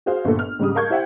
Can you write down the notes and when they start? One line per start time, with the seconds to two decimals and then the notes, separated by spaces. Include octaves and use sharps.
0.06 F#4 G#4 C5 F5
0.25 G1 A#2 A4
0.39 F6
0.59 G#2 C#3 G3 D#6
0.75 A#4 F5 A5 C#6 G6 G#6
0.89 E4 G4 C5 E5 F#5 G5